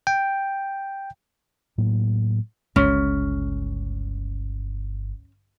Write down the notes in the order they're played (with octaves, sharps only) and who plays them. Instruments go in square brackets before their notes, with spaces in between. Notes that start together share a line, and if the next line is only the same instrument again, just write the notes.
[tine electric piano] G5
[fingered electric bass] A2 F#3 A#3
[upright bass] G1 [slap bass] C#2 C#3 [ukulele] C#4